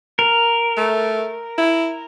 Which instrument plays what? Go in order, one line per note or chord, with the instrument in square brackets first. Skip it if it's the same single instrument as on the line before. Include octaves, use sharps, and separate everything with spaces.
[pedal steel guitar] A#4
[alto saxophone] A3
E4